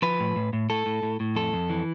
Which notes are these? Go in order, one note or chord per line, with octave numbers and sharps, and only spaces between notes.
F3 B4
A2
A2
A2
A2 A4
A2
A2
A2
F2 A4
F2
E3